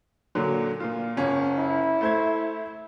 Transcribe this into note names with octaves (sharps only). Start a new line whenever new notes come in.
A#2 D3 F#3
A#2 F4
F#1 C#4
E4
A3 C5 G#6